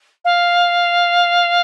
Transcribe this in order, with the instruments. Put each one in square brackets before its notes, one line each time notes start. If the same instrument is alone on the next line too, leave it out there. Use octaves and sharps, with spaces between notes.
[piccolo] F5